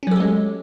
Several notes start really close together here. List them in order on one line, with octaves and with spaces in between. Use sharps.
C#4 F#3 A4 G4 G#3